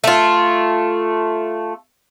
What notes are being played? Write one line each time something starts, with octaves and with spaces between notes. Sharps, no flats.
A3 F4